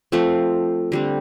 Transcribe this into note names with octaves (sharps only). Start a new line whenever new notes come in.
F3 A3 C4
D3 G3 C4